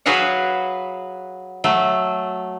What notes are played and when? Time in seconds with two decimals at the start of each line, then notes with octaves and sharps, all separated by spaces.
0.06 F#3 F#4 G#4 B4 F5 F#5
1.64 F#3 A3